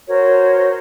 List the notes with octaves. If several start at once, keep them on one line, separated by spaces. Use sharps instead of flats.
F#4 A#4 C5 C#5